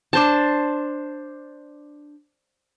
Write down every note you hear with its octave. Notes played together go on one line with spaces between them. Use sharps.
D4 C5 A5